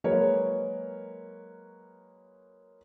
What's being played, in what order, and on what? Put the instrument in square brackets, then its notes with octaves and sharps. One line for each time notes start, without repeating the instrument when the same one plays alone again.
[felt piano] F#3 G#3 A#3 A#4 B4 C#5